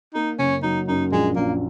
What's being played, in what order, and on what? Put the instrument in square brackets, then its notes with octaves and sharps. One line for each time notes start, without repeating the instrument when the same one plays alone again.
[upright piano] A#3 [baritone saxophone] D#4
[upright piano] F#1 [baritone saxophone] C#4
[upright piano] F#3 [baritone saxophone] D#4
[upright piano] F#2 [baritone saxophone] D#4
[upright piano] A#1 [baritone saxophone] G#3
[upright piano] A#1 [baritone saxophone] A#3